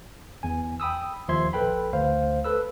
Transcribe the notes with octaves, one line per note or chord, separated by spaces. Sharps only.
E2 G#5
G5 B5 D#6 E6
D#2 F3 E5 C6 G#6
A#1 A4 B4 G5 B5
D2 C5 F5
A4 B4 E6